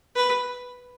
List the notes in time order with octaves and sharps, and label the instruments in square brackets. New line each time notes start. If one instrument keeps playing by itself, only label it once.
[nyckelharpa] B4